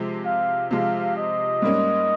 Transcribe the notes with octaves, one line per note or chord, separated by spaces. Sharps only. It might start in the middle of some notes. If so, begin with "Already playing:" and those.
Already playing: C3 F3 G#3
F5
C3 F3 G#3 F5
D#5
G#2 G3 A#3 C#4